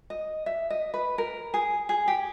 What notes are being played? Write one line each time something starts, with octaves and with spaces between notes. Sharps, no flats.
D#5
E5
D#5
B4
A#4
G#4
G#4
G4